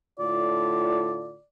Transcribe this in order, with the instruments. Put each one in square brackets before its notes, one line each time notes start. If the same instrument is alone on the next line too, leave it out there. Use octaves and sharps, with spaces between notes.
[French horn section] A2 D3 F4 [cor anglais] D5